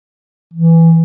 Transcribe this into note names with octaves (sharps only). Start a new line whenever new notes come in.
E3